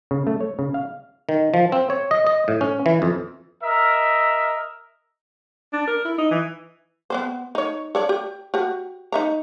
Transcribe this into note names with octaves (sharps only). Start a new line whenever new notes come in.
C#3
A3
C#5
C#3
F5
D#3
F3
C4
C#5
D#5
D#5
A2
C#4
E3
F2
A#4 D#5 E5
D4
A#4
E4
D#4
E3
B3 C4 C5
D#4 C#5
A4 C#5 D5
G4
F#4 G4
D#4 E5 A#5